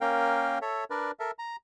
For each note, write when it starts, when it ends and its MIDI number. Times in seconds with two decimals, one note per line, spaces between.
0.01 0.59 58
0.01 0.59 61
0.01 0.59 70
0.01 0.59 77
0.01 0.59 79
0.62 0.84 69
0.62 0.84 73
0.62 0.84 76
0.90 1.11 62
0.90 1.11 70
0.90 1.11 71
0.90 1.11 74
1.19 1.31 69
1.19 1.31 70
1.19 1.31 76
1.39 1.56 82